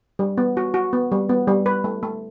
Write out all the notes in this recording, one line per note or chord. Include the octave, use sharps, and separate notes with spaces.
G3
B3
F#4
F#4
B3
G3
B3
G3
B4
A3
A3